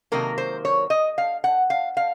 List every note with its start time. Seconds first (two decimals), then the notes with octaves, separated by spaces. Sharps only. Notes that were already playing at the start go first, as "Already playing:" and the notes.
0.12 C3 D#3 F#3 A#3 A#4
0.38 C5
0.65 C#5
0.90 D#5
1.18 F5
1.44 F#5
1.70 F5
1.97 F5